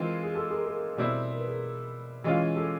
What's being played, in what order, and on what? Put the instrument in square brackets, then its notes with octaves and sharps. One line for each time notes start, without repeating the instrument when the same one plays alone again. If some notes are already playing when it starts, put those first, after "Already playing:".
Already playing: [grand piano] E3 G#3 C4 F4 [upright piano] G#4 A#4
[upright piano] G#4
G4 A4
G#4 A#4
G#4 A#4
[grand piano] B2 G3 C4 E4
[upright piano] A#4
B4
G#4 A#4
[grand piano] E3 G#3 C#4 F4
[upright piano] G4 A4